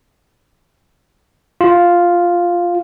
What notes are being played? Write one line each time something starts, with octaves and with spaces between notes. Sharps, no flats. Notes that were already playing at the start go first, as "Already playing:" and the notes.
F4